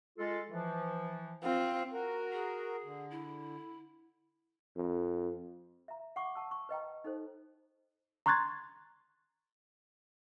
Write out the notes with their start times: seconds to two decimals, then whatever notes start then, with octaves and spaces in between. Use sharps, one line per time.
0.19 G#3 F4 A4
0.50 E3 F3
1.44 C4 F4
1.91 F#4 A#4
2.33 G#4
2.84 D3
3.11 E4
4.76 F2
5.88 E5 A#5
6.16 F#5 C#6 D6
6.35 F#5 A5 E6
6.51 C#6
6.69 B4 D#5 G5 A#5
7.04 D#4 A4 C5
8.26 A#5 C6 C#6 F#6 G#6 A6